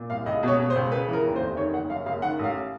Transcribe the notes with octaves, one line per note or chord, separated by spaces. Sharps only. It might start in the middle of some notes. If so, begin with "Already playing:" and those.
Already playing: A#2
C2 F5
C#2 D#5
B2 C#5
B2
C5
C#2
C#3 B4
E3 A#4
D#2
C5
F1
D#3 C#5
F#1 F#5
F#2 F5
F#1 F5
D#3 F#5
A1 F5